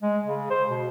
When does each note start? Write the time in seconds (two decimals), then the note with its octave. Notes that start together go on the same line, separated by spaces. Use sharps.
0.02 G#3
0.26 C#3
0.50 C5
0.69 B2